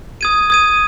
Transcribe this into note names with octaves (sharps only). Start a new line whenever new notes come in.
D#6 G#6 D#7
D#6 G#6 D#7